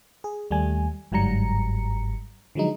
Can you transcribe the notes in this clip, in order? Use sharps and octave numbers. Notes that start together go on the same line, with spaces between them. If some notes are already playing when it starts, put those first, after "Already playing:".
G#4
D#2 G3 A3 G#5
G1 G#2 F#3 G3 A#5 C#7
D3 F3 F#3 G#3 D#4